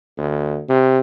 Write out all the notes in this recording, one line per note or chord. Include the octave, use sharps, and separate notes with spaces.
D2
C3